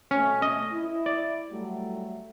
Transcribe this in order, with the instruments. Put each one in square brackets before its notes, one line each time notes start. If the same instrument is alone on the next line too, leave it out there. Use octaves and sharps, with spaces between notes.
[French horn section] B2 A3 [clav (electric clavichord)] C#4
[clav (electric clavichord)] D#5
[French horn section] E4
[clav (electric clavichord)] D5
[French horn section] F#3 G3 A3